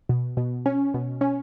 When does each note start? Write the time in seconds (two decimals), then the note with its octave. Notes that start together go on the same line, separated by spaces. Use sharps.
0.09 B2
0.37 B2
0.66 C#4
0.94 B2
1.21 C#4